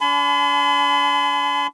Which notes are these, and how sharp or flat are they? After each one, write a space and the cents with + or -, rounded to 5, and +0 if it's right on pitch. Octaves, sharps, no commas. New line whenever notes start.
D4 -45 G#5 +40 B5 +45